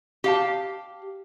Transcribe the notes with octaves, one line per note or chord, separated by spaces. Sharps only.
G4 F5 A5